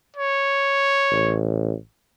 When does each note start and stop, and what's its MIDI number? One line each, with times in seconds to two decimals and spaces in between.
0.17 1.37 73
1.11 1.74 33